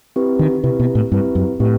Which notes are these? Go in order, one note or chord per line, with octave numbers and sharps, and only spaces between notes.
C4 E4 G4 B4
D#3
C3 C4 E4 G4 B4
B2
A2
G2 C4 E4 G4 B4
F#2
A2 C4 E4 G4 B4